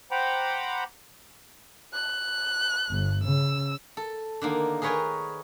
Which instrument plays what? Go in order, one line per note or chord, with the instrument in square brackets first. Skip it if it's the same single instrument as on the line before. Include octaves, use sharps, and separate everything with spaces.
[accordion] C5 F#5 G5 A#5 B5 D6
[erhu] F#6
[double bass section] G1
[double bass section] C#3 [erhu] E6
[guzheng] A4
D3 D#3 A#3
G#4 A#4 B4 C#5 G5 G#5